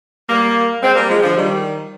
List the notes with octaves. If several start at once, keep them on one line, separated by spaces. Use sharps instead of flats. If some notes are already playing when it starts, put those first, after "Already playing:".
G3 A#3
G#3 C4
G3 A#3
F3 G#3
D3 F3
D#3 G3